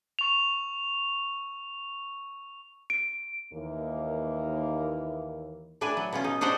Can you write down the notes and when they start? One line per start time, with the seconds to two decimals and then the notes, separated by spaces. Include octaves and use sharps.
0.19 C#6 F7
2.90 D7
3.53 D#2 E3 A#3
5.81 A2 D4 B4 G#5
5.97 F#3
6.13 B2 C#4 F4
6.24 D#4
6.41 D4 D#4 G4 C5 F#5 A#5